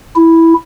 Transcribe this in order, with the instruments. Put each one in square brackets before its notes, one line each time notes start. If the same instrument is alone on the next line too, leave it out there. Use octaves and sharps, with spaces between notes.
[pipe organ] E4